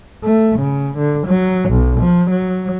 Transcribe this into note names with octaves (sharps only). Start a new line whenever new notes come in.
A3
C#3
D3
F#3
B1
F3
F#3